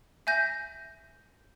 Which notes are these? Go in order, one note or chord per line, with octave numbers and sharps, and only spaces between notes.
E5 G#5 G6 A#6